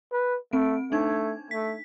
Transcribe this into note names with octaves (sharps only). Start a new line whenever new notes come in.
B4
A3 C4 D7
A3 D4 D#4 G#6
A3 B6